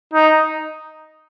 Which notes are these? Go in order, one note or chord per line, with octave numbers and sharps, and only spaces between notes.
D#4